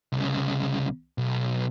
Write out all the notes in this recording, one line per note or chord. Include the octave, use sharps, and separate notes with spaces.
C2 C#3
B1